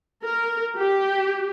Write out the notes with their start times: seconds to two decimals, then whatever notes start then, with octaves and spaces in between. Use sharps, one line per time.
0.25 A#4
0.76 G4